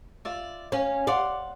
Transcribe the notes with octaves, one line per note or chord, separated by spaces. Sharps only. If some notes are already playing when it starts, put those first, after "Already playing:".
F4 D5 E5
C#4 C#5 F5
D5 F5 F#5 C6